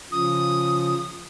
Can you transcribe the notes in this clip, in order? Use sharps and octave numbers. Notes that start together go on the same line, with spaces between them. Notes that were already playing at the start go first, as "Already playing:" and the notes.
C#3 F3 D#6